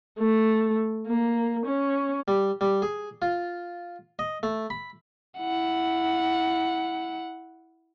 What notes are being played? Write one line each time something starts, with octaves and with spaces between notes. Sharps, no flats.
A3
A#3
C#4
G3
G3
G#4
F4
D#5
A3
B5
E4 F#5